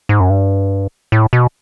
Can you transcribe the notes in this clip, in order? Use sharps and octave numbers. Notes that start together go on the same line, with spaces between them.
G#2
F#2
G2
A2
B2